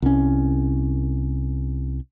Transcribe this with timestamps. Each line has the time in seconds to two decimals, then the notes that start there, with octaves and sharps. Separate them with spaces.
0.02 C2 C#4